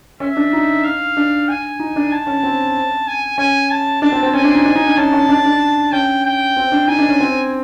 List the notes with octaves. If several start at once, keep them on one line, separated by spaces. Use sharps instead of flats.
C#4 E5
D4
D#4
F5
D4
G#5
D#4
D4
A5
C#4
C4
G#5
C#4 G#5
A5
D4 A5
C4
C4
C#4 G#5
D4
D#4
D4
D#4
D4
C#4 A5
C#4
D4
D4
C#4 G5
G5
C4
D4
D#4 G#5
D4
C#4
C4